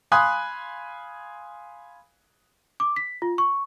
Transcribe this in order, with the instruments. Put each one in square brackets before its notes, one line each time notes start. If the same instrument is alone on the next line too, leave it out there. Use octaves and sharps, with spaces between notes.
[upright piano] F5 G#5 B5 C6 D#6 F#6
[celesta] D6
B6
F4
C#6